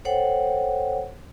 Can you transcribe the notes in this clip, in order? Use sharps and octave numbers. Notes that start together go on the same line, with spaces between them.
A4 C5 C#5 F#5 G5